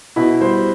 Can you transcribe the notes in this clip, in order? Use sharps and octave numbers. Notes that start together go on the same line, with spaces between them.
B2 E4
G3 C5